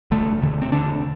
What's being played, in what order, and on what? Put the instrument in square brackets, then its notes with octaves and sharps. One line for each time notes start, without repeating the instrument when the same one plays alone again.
[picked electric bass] E1 D2 D3 A3
E1 D2 D3
C4
E1 D2 D3 D4